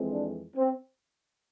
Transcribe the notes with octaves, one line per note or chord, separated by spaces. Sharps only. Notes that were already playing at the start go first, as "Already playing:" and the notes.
Already playing: F2 E3 G#3 C4
D4
C4